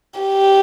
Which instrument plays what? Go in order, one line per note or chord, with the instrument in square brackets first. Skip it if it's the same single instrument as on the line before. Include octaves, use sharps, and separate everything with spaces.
[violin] G4